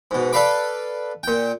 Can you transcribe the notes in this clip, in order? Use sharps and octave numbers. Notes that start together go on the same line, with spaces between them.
G#2 B2
A4 B4 D5 F5 B5 D6
A#2 G5